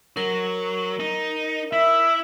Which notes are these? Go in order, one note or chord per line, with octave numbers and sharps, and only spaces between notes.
F#3 A#4
D#4
E4 E5